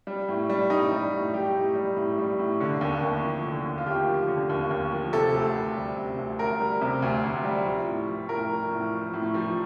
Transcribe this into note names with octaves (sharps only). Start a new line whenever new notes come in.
G3
A2
G3
A2 D#4
G3
A2
G3 G4
A2
G3
A2
G3
A2
D3
D#2
D#2
F3
D3
D#2
F4
D#2 G4
F3
D3
D#2
D#2
F3
C3 A4
D2
D2
G3
C3
D2
D2 A#4
G3
C3
D2
D2
G3
F3
A2
F3
A2 A#4
F3
A2
F3
A2
F3